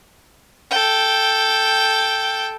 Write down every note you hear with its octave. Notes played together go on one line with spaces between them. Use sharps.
A4 G5